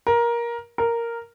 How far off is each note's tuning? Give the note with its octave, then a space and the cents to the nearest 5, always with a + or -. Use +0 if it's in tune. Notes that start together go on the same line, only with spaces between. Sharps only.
A#4 +15
A#4 -5